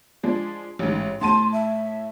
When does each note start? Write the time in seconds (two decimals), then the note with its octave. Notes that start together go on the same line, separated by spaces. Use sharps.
0.23 F3 G#3 D4
0.79 A1 G#2
1.21 A2 A5 C6 D#7
1.53 E5